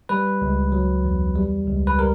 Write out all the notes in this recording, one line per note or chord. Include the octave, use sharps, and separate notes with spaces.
G3 B4
C#2
F#3
E2
G3
C#2
B4
G3 A#4